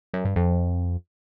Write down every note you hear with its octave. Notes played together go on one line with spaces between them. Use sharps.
F#2
G2
F2